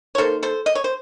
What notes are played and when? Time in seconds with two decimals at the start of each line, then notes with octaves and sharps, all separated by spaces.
0.15 C#5
0.18 D#3 A#3 A4 C5
0.43 A4 C5
0.66 D#5
0.75 C#5
0.84 C5